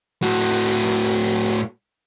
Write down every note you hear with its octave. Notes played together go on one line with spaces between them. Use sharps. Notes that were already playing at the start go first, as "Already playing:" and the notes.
A2 F#4